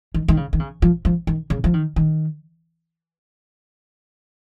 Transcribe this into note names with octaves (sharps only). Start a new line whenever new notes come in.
D#3
D#3
C#3
D#3
C#3
F3
F3
D#3
C#3
F3
D#3
D#3